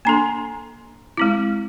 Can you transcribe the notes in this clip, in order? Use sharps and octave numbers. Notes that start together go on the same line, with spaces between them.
A#3 D4 A4 G#5 A#5 C6
G#3 C4 E4 D6